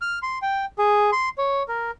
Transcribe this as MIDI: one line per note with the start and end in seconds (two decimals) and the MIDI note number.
0.02 0.19 89
0.22 0.38 84
0.42 0.65 79
0.78 1.11 68
1.12 1.29 84
1.38 1.63 73
1.68 1.91 70